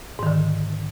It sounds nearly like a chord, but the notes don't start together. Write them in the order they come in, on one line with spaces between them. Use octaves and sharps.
G#2 D#3 D3